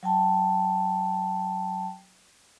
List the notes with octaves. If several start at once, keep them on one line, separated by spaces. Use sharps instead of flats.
F#3 G5 A5